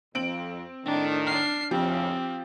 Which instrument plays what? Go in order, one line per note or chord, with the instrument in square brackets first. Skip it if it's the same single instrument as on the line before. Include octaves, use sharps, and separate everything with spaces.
[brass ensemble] F2 [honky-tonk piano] C4 D7 F#7
[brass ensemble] A2 D#3 [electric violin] D4
[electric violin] D4 C7 [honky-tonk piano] F6
[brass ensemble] F2 A2 C#3 [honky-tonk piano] F3 G4 [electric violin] C4